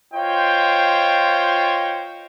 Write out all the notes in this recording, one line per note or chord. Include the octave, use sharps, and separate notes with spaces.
F4 C5 C#5 D#5 G5